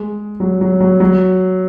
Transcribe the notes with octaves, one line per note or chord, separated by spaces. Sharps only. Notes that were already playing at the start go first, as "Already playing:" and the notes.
Already playing: G#3
F#3
F#3
F#3
F#3